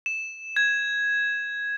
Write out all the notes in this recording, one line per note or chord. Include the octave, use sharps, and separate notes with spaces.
E7
G#6